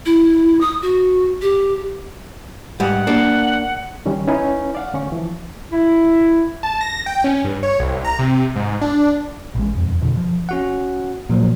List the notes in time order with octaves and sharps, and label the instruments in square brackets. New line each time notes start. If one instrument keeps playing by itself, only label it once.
[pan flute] E4
D#6
F#4
G4
[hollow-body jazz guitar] G#2 G3 [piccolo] F#5
[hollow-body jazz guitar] A#3 D4
[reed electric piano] G2 D#3 G3 C#4
C#4 D#4 E4 B4
D5 F5 F#5
D2 C#4 C#6
E3 F3
[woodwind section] E4
[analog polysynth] A5
A#6
G5
C#4
G2
C#5
C2
A#5
C3
G#2
D4
[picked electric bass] A1 G#3
E1 F2
F2 B2 D3
F3
[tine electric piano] C#4 F#4 F#5
A#2 F3 F#3